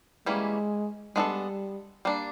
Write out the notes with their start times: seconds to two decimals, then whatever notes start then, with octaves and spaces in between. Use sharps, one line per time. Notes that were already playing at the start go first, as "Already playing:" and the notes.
0.26 E3 G3 G#3 A#3 C#4 E4
1.16 G3 G#3 B3 D4 F#4 A4
2.05 G3 A#3 D4